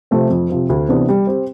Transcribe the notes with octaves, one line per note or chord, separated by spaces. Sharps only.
C3 F3 A3 C4
F2
C3 F3 C4
D2
C3 E3 B3 D4
G3
C4 G4